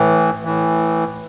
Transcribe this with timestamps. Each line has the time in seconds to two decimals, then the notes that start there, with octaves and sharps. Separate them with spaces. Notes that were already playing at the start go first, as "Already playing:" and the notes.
Already playing: A2 E3
0.45 A2 E3